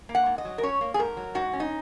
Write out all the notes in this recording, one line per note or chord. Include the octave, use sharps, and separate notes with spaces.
A#3
F#5
G#2
D#5
F#3
A#4
C#4 C#5
A#3
G#4
G#2 A#4
F#3
G#2 F#4
C#4
D#4